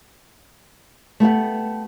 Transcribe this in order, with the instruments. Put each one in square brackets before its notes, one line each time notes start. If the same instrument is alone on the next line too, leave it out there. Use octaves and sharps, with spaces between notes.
[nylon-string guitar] A3 B3 G4 F#5